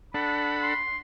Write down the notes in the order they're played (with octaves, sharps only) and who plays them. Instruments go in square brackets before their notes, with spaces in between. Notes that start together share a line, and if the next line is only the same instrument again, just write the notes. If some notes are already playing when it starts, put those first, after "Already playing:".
[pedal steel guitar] D4 [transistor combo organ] A4 F#5 [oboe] B5
[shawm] C6